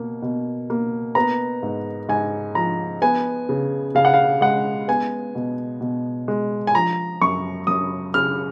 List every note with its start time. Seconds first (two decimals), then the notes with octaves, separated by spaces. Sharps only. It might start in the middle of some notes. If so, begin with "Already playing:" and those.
Already playing: B2 A#3
0.22 B2
0.70 A#3
1.15 B3 A#5
1.63 G#2
2.09 G#2 G#5
2.55 F3 A#5
3.02 B3 G#5
3.49 C#3
3.95 C#3 F5
4.05 F#5
4.14 F5
4.41 G#3 F#5
4.88 B3 G#5
5.35 B2
5.81 B2
6.28 G#3
6.67 G#5
6.74 F3 A#5
7.22 F#2 C#6
7.67 F#2 D#6
8.14 C#3 F6